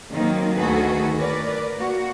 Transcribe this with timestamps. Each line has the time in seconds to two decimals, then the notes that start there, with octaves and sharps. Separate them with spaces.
0.11 D#3 F#3 A#3 C4 D#4
0.56 D2 D#3 F#4 G#4 A4 B4
1.17 A#4 B4 D5
1.76 A#3 F#4